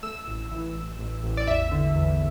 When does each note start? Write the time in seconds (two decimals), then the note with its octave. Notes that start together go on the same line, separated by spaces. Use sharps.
0.03 A3 E6
0.27 A1
0.51 E3
0.75 A1
0.99 A1
1.23 A1
1.37 D5
1.47 E2 E5
1.72 D3
1.96 E2